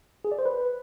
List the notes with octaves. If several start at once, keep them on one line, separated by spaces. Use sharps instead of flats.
G#4
D5
C5
B4